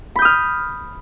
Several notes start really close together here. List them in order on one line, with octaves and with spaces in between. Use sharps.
B5 G6 D#6 F6